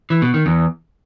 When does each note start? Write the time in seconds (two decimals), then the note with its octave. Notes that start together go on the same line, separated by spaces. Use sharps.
0.10 E3
0.22 B2
0.34 D#3
0.46 E2